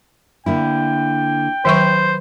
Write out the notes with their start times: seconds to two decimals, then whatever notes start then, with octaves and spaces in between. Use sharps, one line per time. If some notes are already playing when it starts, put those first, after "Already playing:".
0.46 D3 A#3 E4 G5
1.65 D#3 F#3 B4 C5 C#6